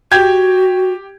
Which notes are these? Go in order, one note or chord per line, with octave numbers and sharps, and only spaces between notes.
F#4 G4 G6 G#6